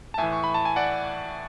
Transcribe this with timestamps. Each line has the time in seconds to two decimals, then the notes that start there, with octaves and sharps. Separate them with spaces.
0.14 A5
0.18 A2 E3 E5 G#5
0.33 C#6
0.44 B5
0.54 A5
0.65 G#5
0.76 D5 F#5